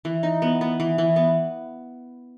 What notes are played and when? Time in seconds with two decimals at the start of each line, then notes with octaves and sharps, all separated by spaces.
0.05 E3
0.23 D#4
0.42 B3
0.61 B3
0.80 E3
0.98 E3
1.16 B3